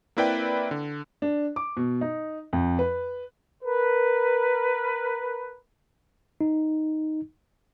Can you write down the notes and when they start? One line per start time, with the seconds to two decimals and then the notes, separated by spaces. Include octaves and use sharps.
0.17 A#3 C4 E4 B4 D5 G5
0.71 D3
1.22 D4
1.56 D6
1.77 B2
2.01 D#4
2.53 F2
2.79 B4
3.63 A#4 B4
6.41 D#4